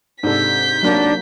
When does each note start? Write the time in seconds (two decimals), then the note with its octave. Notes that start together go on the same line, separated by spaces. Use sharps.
0.23 G#2 C3 D4 A4 G6 B6
0.83 F#3 A#3 D4 F#4